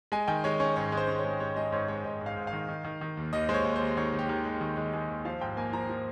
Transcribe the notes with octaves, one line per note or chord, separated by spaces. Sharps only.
G#3 G#5
D#3 G5
G#3 C#5
C#4 C#5
G#2 C#5
G#3
C5
C#4
C#5
G#3
G#3 C#5
G#3 D#5
G#2 C#5
G#3 C#5
G#2 D#5
G#2
F5
G#2
F5
D#3
D#3
D#3
D#3
D#2
D#2 D#5
G#3 C5
C#5
D#2
C5
D#2
D#3 C#5
D#3
G4
D#3
G#3
D#3
G#3
G#3
D#2
F3 F5
G#2 G5
A#3 G#5
F3 A#5
F3